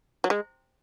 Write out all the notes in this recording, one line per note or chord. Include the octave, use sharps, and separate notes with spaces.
F#3
G#3